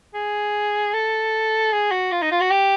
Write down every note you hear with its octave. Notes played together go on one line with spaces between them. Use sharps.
G#4
A4
G#4
F#4
F4
D#4
F4
F#4
G4